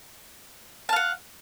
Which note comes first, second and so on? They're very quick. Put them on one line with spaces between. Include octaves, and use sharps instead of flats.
A5 F5 F#5